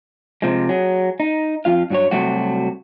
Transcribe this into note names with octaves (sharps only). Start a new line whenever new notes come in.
C3 F3 G#3
F#3 G#4
D#4
F2 F4 F5
G2 F#3 F#4 C#5
C3 F#3 G3 A3 F#4